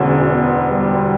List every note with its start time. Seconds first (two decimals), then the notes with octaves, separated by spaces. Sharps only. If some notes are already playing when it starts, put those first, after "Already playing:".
Already playing: E1 D2 D3 C#4
0.30 B3
0.71 G3